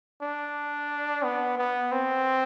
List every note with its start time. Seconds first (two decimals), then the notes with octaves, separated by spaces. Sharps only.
0.23 D4
1.24 B3
1.58 B3
1.92 C4